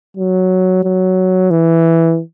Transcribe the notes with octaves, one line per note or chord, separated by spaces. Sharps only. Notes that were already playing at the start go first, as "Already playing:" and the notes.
F#3
F#3
E3